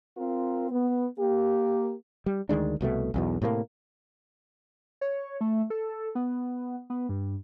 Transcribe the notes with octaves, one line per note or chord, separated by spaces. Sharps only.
C4 F4 A#4
B3
A#3 G4
G3
D2 D#3 G#3 D4
C2 B2 E3 A3
B1 E2 B2
A2 C3 A3 A#3
C#5
A3
A4
B3
B3
G2